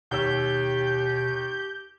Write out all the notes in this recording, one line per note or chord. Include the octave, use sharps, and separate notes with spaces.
D#2 B2 G4 C#5 E6 G6